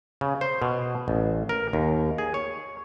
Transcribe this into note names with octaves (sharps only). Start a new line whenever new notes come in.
C#3
C5
B2
A1
A#4
D#2
G#4
C#5